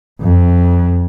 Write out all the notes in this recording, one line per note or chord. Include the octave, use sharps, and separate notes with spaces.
F2